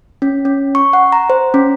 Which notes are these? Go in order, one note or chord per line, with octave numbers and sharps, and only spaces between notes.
C#4
C#4
C#6
F#5
A#5
C5
C#4